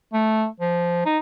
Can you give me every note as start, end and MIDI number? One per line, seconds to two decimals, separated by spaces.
0.13 0.46 57
0.60 1.04 53
1.06 1.18 63